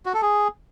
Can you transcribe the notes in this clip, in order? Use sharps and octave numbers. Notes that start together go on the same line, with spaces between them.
F#4
A4
G#4